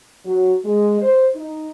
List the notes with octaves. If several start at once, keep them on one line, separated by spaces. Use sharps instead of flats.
F#3
G#3
C5
D#4